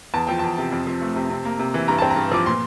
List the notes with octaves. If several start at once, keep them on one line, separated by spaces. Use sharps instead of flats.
E2 A5
F3 G5
E2 A5
C3
F2
F3
A3
C3
C3
A#3
C3
E3
G2 A#5
C4 A5
A#5
G2
F3 D6
A#2 C6